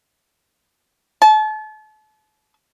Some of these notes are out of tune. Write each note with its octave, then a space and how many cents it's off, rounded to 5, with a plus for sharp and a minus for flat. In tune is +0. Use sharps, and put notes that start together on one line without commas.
A5 -35